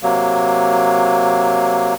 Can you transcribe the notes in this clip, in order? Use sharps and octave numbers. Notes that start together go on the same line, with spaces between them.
C3 F#3 A#3